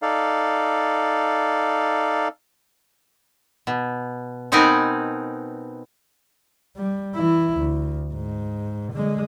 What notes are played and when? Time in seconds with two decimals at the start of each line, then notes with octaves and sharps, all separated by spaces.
0.02 D#4 A4 D5 F5
3.67 B2
4.52 B2 C4 D#4 A#4 B4 G#5
6.77 G3
7.15 E3 E4
7.59 D2
8.13 G#2
8.93 D3 G#3